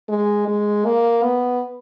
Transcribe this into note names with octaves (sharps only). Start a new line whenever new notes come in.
G#3
G#3
A#3
B3